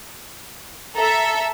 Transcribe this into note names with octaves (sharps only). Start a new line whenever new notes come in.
A4 E5 A#5